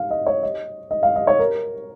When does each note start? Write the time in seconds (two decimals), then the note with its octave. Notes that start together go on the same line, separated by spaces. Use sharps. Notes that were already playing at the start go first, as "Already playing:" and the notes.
Already playing: F5
0.11 D#5
0.27 C#5
0.43 D#5
0.91 D#5
1.03 F5
1.16 D#5
1.27 C#5
1.39 A#4